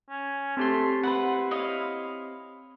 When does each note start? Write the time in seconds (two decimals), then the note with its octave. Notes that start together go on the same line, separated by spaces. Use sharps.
0.10 C#4
0.57 A3 C4 G4 C6
1.03 E4 B4 C5 F#5
1.51 C#5 D#5 F5